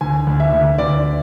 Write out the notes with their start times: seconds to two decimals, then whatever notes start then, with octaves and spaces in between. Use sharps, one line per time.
0.01 D2 G#5
0.27 D2
0.40 E5
0.53 D2
0.78 D2 D5